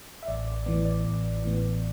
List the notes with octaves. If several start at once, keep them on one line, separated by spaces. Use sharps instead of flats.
E5
A1 D5
D5
A2 E3 B3 D5
D5
A1
A2 E3 B3